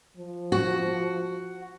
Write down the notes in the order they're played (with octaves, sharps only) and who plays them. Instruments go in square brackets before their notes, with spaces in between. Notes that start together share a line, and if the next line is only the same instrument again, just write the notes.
[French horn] F3
[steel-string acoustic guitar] F#4